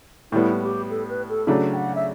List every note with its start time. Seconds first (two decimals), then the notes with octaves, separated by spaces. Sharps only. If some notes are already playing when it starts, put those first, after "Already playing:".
0.32 A2 G3 B3 E4
0.62 G4
0.90 A4
1.09 B4
1.29 A4
1.47 C#3 F#3 A3 D4
1.73 G5
1.77 F#5
1.95 E5